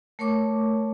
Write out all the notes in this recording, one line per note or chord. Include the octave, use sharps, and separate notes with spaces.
A3 A#4 C#5 C#6 D6